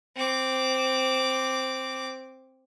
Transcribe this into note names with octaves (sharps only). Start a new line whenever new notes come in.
C4 D6